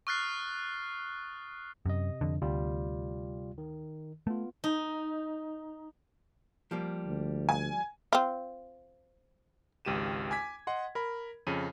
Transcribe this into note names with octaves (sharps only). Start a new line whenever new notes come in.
C#6 D#6 F6 F#6 A6 C7
F#2 C3 D#5
F2 D3
D2 C3 G3 F4
D#3
A3 B3 F4
D#4
F3 G3 A#3
D2
G#5
C4 F4
G#1 C#2 G4 D#7 E7
G#5 D6 G#6 B6
D#5 F#5 C6
A#4 B5
F2 C#3 D#7